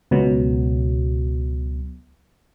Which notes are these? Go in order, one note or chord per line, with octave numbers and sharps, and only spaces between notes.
C#2 B2 F#3